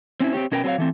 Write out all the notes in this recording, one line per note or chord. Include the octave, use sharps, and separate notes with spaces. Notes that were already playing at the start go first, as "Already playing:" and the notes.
C4 C#4 D#4 E4
C4 C#4 G4 C#5
B2 C#4 A#4 B4 G5
F#3 C4 G#4 B4 C#5 F5
E3 A3 C4